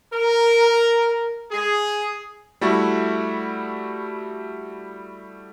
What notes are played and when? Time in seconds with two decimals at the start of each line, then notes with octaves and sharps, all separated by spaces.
0.13 A#4
1.52 G#4
2.61 G3 A3 E4 F#4